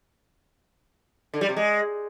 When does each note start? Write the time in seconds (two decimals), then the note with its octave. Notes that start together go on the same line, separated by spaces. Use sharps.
1.34 D3
1.41 G3
1.49 C3
1.56 G#3